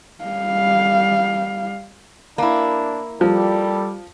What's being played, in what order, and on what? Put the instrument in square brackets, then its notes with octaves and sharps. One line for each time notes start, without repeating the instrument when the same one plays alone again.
[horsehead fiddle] G3 F5
[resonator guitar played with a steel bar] A#3 E4 [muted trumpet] D4
[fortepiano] F3 [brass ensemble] G3 [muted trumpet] A4